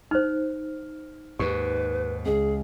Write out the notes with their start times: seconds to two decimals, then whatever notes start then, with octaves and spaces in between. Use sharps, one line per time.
0.11 D#4 C5 F6
1.39 D#2 G#2 G4 B4
2.25 C#2 G#4